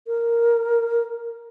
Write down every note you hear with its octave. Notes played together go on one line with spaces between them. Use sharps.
A#4